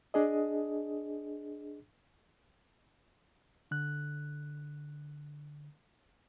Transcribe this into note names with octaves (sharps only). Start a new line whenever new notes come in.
D4 G#4 D#5
D3 F#6